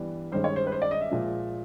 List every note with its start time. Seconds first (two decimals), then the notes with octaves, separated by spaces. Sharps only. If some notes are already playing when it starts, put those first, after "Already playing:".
Already playing: G2 E3 G3 B3 D4
0.32 G2 D#3 G#3 C#4 C5
0.44 C#5
0.56 C5
0.67 B4
0.72 C5
0.82 D5
0.91 D#5
1.01 E5
1.11 A#2 F3 G#3